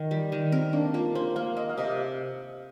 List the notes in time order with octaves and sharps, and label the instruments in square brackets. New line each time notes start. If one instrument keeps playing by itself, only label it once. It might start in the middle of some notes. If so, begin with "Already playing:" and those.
Already playing: [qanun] D#3
G3
D#3
[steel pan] C4 [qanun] A#4
[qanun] A#3 [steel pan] D4
[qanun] A#3 [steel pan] F4
[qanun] A#3 [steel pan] C5
[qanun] A#3 [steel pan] F5
[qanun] A#3 [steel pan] D#5
[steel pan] F5
[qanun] C3 [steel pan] D#5